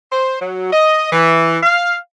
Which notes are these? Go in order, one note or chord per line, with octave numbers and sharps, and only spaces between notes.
C5
F#3
D#5
E3
F5